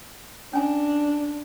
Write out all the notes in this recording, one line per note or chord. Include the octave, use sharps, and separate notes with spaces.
C#4 D4 G#5